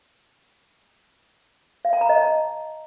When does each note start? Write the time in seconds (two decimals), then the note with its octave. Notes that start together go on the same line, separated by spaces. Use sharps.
1.85 F5
1.93 A5
2.01 A#5
2.09 D#5
2.18 A5